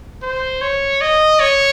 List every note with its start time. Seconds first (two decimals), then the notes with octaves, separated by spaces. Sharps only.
0.22 C5
0.61 C#5
1.01 D#5
1.40 C#5